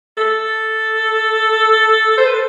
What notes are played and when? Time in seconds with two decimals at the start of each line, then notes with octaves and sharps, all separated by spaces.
0.17 A4
2.18 C5
2.26 B4
2.34 A4